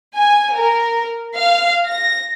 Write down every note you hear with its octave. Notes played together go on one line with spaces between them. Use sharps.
G#5
A#4
F5
A#6